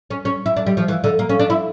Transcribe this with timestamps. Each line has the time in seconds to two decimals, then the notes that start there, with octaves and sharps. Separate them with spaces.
0.10 C#4
0.25 C#4
0.46 E4
0.57 D4
0.66 G3
0.77 F3
0.88 E3
1.04 D3
1.19 A#3
1.29 C#4
1.39 D4
1.50 E4